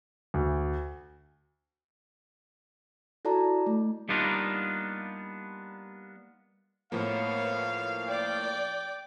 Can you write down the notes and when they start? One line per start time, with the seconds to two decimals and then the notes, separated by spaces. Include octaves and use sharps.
0.34 D2
3.25 E4 F#4 A4 D5 A5 A#5
3.67 A3
4.09 G3 A#3 B3 D4 D#4 F4
6.92 A2 F3 A#3 B3 C#5 F5
8.08 D5 G5 D6